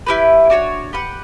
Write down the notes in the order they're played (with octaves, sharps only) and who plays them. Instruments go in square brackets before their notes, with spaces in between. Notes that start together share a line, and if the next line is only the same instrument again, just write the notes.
[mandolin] E4 G4 B4
D4 F#4 C#5
G4 B4 F#5